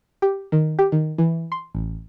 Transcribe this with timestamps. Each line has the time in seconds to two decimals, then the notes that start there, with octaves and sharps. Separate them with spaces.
0.22 G4
0.52 D#3
0.79 G4
0.92 D#3
1.18 E3
1.52 C6
1.75 A1